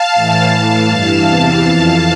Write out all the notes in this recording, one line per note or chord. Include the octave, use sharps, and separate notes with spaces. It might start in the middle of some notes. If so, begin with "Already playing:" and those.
Already playing: F5 A5
A2 E3
A2 E3 F5 A5
G2 E3
E2 C3 E3
F2 E3